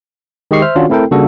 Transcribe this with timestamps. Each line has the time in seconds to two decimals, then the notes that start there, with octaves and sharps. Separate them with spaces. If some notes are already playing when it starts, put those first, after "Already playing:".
0.51 D#3 G#3 G4 D#5 C#6 C7
0.62 C5 E5 F6
0.75 D#3 C#4 D4 F4 F#4 C#5
0.89 A3 C4 E4 A4 A#4 G5
1.11 C#3 G3 A#3 D4 F#4 A4